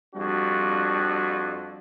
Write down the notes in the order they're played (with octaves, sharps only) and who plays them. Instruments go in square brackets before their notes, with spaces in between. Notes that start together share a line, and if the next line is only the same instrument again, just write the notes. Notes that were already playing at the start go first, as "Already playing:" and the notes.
[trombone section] F2 G3 D4 F#4